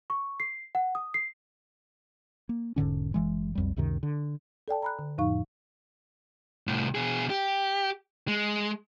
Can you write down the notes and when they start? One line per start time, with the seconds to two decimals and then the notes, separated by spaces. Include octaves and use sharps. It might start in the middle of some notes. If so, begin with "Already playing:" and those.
0.10 C#6
0.40 C7
0.75 F#5
0.95 D#6
1.14 C7
2.49 A#3
2.76 E1 G#2 D3 C#4
3.14 F#1 E3 G#3
3.55 B1 F2 G3
3.77 C#2 F#2 C3 D#3
4.03 D3
4.68 A4 D5 G5 A5
4.82 A#5 B5 F#6
4.99 D3
5.18 F2 A2 F3 D#4 F5 C#6
6.67 C2 A2
6.95 B2 G#4
7.30 G4
8.28 G#3